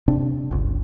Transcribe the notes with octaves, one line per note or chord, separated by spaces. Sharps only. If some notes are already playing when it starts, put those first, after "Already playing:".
C3 C4 D4
G1 C#2